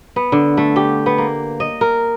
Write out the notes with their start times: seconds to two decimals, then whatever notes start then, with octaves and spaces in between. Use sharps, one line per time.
0.16 B3
0.32 D3
0.57 A3
0.76 G4
1.06 B3
1.18 A#3
1.60 D#5
1.81 A#4